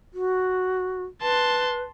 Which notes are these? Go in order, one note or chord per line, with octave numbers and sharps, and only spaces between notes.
F#4
B4 A5 C6